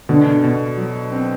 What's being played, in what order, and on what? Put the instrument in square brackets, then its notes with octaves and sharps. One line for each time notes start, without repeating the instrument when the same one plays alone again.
[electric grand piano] B2 [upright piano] D3
[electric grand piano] B2
F#3
C4